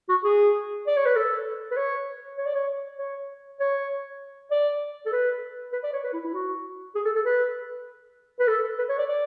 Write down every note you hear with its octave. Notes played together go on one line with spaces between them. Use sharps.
F#4
G#4
D5
C#5
B4
A4
B4
C#5
C#5
D5
C#5
C#5
C#5
D5
A4
B4
B4
D5
C#5
B4
E4
E4
F#4
G#4
A4
A4
B4
B4
A4
B4
C#5
D5
D5